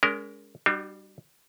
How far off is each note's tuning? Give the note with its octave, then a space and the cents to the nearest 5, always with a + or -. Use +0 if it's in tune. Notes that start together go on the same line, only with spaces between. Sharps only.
G#3 +0 C#4 +40 A#4 +0
G3 +0 D4 +40 F#4 +30